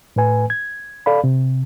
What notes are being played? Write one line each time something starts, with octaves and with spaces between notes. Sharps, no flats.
A2 A3 B4 G#5
G#6
A4 D5 F5 B5
C3